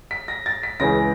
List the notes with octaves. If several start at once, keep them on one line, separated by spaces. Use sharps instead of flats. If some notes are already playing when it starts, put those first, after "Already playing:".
B6
A#6
A6
B6
C#2 C#3 E3 G#3 A#6